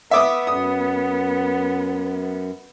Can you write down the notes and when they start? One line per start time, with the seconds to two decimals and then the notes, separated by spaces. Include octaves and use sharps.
0.11 B3 E5 D6 D#6
0.47 F#2 D#6